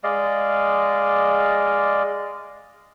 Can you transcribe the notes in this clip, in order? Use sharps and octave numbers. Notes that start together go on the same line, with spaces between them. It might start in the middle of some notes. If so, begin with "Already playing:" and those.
G#3 D5 D#5 F5